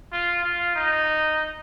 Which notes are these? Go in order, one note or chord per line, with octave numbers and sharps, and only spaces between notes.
F4
F4
D#4